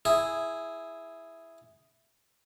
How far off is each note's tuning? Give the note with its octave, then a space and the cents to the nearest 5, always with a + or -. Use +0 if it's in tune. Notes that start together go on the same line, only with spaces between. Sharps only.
E4 +0 G#4 +0